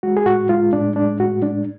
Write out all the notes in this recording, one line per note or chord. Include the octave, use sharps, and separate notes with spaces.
G#3 F#4
G#4
A2 F#4
G#3 F4
A2 D4
G#3 D4
A2 F#4
G#3 D4